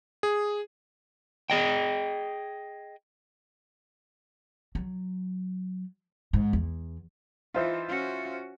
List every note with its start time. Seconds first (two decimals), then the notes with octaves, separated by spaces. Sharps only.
0.23 G#4
1.50 G#4 D#5 G5
4.75 F#3
6.33 G#2
6.53 E2
7.54 E3 D#4 F4 C5 E5
7.89 C#4 F#4